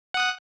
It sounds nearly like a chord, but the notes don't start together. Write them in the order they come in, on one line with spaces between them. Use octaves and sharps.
F#5 D#6 F#6